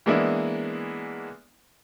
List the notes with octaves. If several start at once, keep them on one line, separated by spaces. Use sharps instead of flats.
E3 G#3 A#3 B3 D4 E4